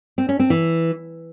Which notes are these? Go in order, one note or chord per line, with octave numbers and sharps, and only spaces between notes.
C4
C#4
C4
E3